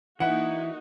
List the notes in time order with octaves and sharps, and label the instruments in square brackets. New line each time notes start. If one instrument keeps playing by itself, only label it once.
[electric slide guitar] E3 E4 [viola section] A#3 D#4 F#4 [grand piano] F#5